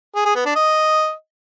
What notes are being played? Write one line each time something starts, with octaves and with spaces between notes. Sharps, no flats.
G#4
G#4
B3
D4
D#5